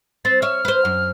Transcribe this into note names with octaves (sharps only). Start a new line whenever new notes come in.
C4 A6
C#5 E5 F6
B4 C5
F#2